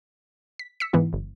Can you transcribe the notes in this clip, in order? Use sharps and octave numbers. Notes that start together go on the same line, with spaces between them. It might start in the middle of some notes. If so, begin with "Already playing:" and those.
B6
E6 B6 C#7
G#2 E3 B3 E4
G1